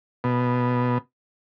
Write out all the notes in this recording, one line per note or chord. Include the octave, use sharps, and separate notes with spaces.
B2